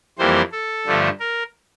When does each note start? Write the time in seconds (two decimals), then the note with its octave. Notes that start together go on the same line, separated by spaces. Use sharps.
0.18 F2 E3 G3 A#3 C5
0.52 A4
0.86 G2 D3 F3 A3
1.20 A#4